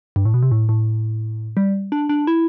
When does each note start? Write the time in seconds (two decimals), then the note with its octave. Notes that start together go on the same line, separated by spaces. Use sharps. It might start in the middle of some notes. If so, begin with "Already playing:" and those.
0.16 G2
0.25 A2
0.34 B2
0.43 C3
0.51 A2
0.69 A2
1.57 G3
1.92 D4
2.09 D4
2.27 E4